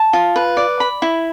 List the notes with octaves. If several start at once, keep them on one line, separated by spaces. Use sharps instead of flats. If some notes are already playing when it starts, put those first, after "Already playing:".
Already playing: A5
F4
B4
D5
B5
E4